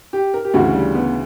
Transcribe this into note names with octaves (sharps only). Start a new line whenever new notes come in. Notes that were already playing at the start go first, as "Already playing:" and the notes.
G4
A#4
G4
D2 C#3 E3 F#4
G3
B3